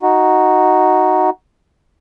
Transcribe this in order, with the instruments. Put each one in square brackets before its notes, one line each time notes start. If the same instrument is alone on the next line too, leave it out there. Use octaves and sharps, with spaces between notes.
[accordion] D#4 F#4